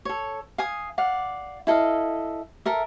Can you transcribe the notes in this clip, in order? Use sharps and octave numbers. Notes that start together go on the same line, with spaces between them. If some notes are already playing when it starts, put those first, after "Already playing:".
A4 C#5
F5 G#5 D#6
D5 F5 F#5
E4 A4 D#5 F5
A4 A#4 E5